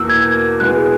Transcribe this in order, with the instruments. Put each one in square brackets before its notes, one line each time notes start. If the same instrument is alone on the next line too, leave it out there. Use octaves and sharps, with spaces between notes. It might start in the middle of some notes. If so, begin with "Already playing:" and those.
Already playing: [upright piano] E2 B2 A#3 E4 A#4 [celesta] E6
[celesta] G#6
[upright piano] B2 G#3 B3 E4 G#4 [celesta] F#6